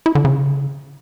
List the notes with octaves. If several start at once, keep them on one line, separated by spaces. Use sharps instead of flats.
E4
D3
C#3